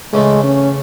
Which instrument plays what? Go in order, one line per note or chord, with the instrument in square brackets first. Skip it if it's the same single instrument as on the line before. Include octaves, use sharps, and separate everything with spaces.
[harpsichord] C#3 E3 A3 [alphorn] G#3
[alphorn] C#4